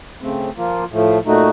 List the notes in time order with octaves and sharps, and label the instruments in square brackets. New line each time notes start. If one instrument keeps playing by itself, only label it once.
[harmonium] C#3 A3 C4
F3 A#3 F4
A2 F3 A3
A#2 A3 D#4 F#4